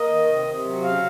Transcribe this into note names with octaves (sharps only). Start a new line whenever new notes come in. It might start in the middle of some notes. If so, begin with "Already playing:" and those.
Already playing: A#3 D#5
D#3
C3
C3
F#3
C#3 F5